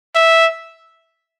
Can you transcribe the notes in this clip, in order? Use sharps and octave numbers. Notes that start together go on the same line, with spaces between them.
E5